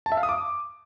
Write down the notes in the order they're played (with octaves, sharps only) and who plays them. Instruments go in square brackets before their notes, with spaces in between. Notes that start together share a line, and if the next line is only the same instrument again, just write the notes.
[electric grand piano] A5
E5
F5
D#6
D6